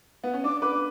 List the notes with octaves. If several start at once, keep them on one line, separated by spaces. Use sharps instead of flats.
B3
C#4
D4 D6
B4 D6